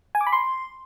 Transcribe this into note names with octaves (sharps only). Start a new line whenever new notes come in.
G#5
D6
B5
C6